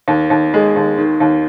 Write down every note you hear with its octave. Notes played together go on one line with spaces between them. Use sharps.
D#2
D#2
G#3
D#2
D#3
D#2